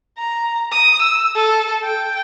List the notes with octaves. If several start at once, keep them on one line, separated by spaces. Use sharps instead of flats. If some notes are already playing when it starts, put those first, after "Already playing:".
A#5
D#6
E6
A4
G5